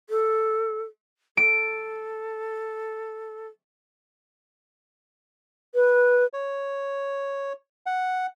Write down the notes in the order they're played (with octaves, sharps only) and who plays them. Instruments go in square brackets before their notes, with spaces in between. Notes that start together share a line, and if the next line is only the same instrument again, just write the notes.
[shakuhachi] A4
[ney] A4 [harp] D7
[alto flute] B4
[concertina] C#5
F#5